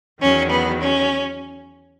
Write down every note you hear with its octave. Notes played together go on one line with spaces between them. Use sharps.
E2 D#3 F#3 C#4
B3
C#4